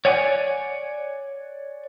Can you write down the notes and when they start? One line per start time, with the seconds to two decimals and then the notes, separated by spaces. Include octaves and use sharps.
0.05 C#5 D5 F#5 G#5